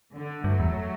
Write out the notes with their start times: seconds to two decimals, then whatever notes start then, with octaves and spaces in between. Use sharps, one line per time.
0.13 D3
0.44 G2 F#3 A3
0.60 E2